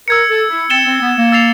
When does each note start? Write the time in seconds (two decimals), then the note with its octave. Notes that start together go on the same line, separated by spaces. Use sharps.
0.08 A#4 E6 G#6 C#7
0.29 A4
0.49 E4
0.70 C4 A6 C#7 E7 G7
0.86 C4
1.01 B3
1.17 A#3
1.32 E6 A6 C7 F7